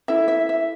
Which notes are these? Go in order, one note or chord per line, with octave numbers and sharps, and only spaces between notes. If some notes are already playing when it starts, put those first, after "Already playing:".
E4 A4 E5
E5
E5